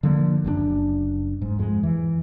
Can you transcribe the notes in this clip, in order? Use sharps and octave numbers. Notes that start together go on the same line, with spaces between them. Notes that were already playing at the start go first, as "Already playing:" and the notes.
D3 F3 G3 A#3
F#1 F#2 A#2 D4
G#2
F2 G#3
E3